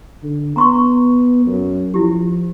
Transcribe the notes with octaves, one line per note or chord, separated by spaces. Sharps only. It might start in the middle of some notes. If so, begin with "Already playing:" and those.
D3
B3 A#5 C6 C#6
F#2
F3 E4 G4